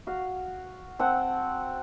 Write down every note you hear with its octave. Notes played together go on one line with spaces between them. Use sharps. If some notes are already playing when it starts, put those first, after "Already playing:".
F#4 F5
C4 A4 F#5